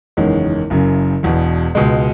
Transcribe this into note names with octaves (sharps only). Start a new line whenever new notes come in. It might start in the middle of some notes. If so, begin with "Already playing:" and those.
F#1 E2 D#3 G#3 C#4
F#1 F#2 C#3
E1 E2 B2
C#2 B2 G#3